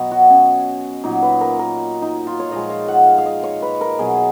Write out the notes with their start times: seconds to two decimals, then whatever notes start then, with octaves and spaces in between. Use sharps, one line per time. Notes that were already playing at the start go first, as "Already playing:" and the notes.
Already playing: B2 F#3 C#5 D#5
0.11 F#4
0.30 C#4
1.04 A#2 F#3 D#4
1.22 B4
1.41 A#4
1.59 A#4
2.02 D#4
2.27 F4
2.39 C#5
2.51 A#2 F3 G#3 D#5
2.70 F5
2.88 F#5
3.07 F5
3.18 F5
3.25 D#5
3.43 C#5
3.62 B4
3.81 A#4
3.99 B2 F#3 G#4